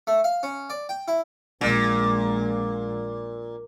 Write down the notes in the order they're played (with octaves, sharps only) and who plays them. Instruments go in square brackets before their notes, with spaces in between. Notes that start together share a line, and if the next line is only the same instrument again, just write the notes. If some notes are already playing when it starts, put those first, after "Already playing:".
[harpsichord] A3
F5
C#4
D5
G5
E4
[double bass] A#1 G#3 [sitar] A#2